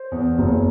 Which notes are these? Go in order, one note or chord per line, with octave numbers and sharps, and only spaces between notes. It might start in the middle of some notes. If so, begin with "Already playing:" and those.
Already playing: C5
E2
F#1